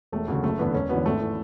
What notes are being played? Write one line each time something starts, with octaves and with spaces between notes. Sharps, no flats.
E1 A3
D2 C#3 F#3
F#1 A3
E2 D3 B3
E1 C#4
E2 D3 F#3 B3
G#1 A3
E3